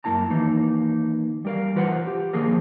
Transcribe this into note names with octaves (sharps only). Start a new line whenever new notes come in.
F#2 A#3 E4 A5 A#5
D#3 E3 A#3 D#4
G3 A#4 F5
E3 F4 B4 C5 F#5
G4
D#3 F3 A#3 G#4 A#4